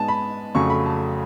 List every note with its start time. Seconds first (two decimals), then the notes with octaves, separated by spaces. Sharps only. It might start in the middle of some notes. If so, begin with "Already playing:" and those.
Already playing: G#2 G#3 B3 G#5 A5
0.08 B5
0.55 F2 C#3 F#3 A3 C#6
0.70 B5
0.86 A5